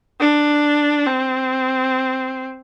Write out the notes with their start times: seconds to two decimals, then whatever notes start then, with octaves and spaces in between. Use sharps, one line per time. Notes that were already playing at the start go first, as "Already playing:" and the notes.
0.20 D4
1.07 C4